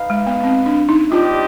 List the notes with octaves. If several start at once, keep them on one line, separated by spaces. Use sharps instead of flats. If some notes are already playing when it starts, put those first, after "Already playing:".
Already playing: D#4 B4 F5
G#3
B3
C4
D4
D#4
G3 D4 F4 G4 C5 D#5